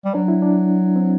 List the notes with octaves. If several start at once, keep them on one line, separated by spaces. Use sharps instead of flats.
G3
F#3 D4
E4
D4
C4